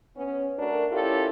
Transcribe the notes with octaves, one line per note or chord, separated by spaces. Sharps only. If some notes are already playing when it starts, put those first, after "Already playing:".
B3 C#4
A3 D4 F#4 A#4
C#4 E4 F4 G4 A4 A#4